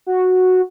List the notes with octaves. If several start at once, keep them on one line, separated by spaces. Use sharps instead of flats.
F#4